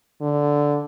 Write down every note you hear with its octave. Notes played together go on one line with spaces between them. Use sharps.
D3